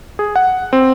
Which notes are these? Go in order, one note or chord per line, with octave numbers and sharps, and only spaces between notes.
G#4
F#5
C4